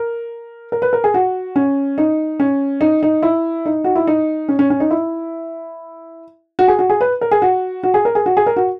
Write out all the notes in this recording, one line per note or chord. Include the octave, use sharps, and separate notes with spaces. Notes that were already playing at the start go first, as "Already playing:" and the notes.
Already playing: A#4
A#4
B4
A#4
G#4
F#4
C#4
D#4
C#4
D#4
D#4
E4
D#4
F#4
E4
D#4
C#4
C#4
C#4
D#4
E4
F#4
G#4
F#4
G#4
B4
A#4
G#4
F#4
F#4
G#4
A#4
G#4
F#4
G#4
A#4
F#4